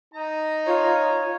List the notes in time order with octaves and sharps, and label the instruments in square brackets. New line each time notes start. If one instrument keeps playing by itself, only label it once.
[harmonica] D#4 A#5
[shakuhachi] F4 [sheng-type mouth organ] C#5